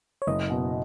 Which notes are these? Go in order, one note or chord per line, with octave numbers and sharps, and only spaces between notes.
C#5
F#1 D#5
B2